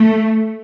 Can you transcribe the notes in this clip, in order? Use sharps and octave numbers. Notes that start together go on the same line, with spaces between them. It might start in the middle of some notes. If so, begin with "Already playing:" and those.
Already playing: A3